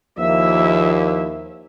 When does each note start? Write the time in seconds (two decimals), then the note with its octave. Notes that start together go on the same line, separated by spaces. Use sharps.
0.19 D#2 F3 A#3 E4 E5